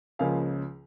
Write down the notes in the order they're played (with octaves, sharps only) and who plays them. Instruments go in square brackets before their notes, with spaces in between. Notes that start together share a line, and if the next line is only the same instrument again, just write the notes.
[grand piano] C#2 C#3 F3 A#3 F5 G#5